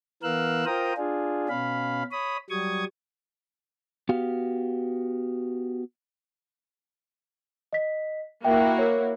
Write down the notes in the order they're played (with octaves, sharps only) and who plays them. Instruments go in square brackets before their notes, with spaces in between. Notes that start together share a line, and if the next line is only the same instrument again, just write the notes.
[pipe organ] E3 B3 A#4 F5 E6 F#6
F4 A#4 C5 G5 A#5 D#6
D4 F4 G#4
B2 C#4 F5 B5
C#5 B5 D#6
F#3 G3 C#6 D#6 G#6
[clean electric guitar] B3 F#4 G4 F5
[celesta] D#5 B6
[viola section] A#3 E4 F#4 [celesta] E5 G5
[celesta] A#4 C#5